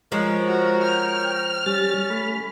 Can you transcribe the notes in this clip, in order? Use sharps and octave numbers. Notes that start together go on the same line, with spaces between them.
F3 G#3 A#4 C#5
F#4
G5 F6
G3 C#4 A6
A3 B5